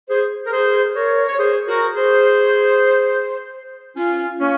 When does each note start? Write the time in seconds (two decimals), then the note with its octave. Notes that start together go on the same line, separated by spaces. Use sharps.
0.09 G#4 C5
0.46 A#4
0.52 G#4 C5
0.95 A#4 C#5
1.27 C#5
1.38 G#4 C5
1.67 F#4 A#4
1.96 G#4 C5
3.96 C#4 F4
4.40 A#3 C#4